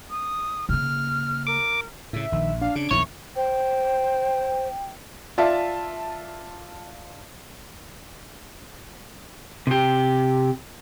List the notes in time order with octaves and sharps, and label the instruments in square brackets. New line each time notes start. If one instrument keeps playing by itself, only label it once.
[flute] D#6
[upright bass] C#3 A#3 [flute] F6
[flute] A#4 [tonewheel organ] D6
[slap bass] A2 C#3 [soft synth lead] E5
[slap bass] A#1 [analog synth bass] D#3
[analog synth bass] D4 [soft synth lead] F5
[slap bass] C#3 [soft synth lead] D7
[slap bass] A#1 E2 D#3 [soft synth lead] E4 [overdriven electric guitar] C#5
[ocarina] C5 [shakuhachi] G5
[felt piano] F4 D5 E5 A5
[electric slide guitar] C3 G4